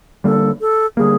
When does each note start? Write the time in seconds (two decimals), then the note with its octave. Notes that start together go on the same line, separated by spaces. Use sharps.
0.24 D3 G3 A#3 A4
0.61 A4
0.97 D3 G3 A#3 G#4